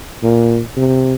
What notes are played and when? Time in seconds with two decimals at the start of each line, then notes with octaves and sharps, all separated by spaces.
0.23 A#2
0.77 C3